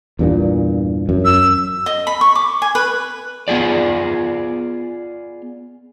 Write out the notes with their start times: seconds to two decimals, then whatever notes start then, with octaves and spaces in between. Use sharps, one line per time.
0.19 E2 G2 A#2
1.09 F#2
1.25 E6
1.86 D#5
2.07 B5
2.21 C#6
2.35 D6
2.62 G#5
2.75 B4
3.48 B3 F4 G#4 D5